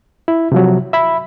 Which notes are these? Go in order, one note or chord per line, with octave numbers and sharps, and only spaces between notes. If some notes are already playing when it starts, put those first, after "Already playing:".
E4
C3 F3 F#3
E5 B5